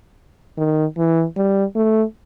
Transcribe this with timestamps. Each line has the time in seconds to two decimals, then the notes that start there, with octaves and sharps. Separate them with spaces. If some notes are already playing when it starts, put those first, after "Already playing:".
0.57 D#3
0.97 E3
1.37 G3
1.75 A3